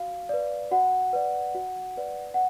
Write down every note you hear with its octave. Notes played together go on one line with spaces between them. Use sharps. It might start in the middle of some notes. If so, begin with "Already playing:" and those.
Already playing: F#4 F5
B4 D5
F#4 F#5
B4 D5
F#4
B4 D5
F#5